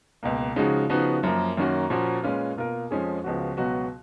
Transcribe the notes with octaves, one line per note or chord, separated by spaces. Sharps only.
C#2 B2 A#3
C#3 F3 G#3 D#4 F#4
C#3 F3 B3 D#4 F#4
F#2 F3 A#3
F#2 D#3 A#3 C#4 F#4
A#2 F3 A#3 C#4 F#4
A#2 G#3 C#4 F4 B4
B2 A#3 F4 A#4
F2 F3 G#3 C#4 G#4
C#2 C#3 F3 B3 F#4
C#2 B2 F#3 B3 F#4